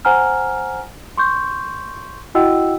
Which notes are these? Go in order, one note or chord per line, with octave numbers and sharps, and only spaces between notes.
C5 F#5 G#5 A#5 F6
C6 C#6 G6
E4 F#4 D#5 F#5 G5 E6